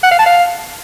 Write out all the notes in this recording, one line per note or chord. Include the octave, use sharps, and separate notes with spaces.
F#5
F5
A5
F5